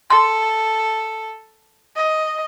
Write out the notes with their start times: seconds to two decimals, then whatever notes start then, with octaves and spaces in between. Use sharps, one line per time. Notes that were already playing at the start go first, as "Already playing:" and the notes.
0.10 A4 C6
1.96 D#5